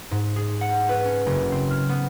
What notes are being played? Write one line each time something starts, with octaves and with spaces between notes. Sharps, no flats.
G#2
G#4
F#5
B4
C#4
F#1
C4
F6
B3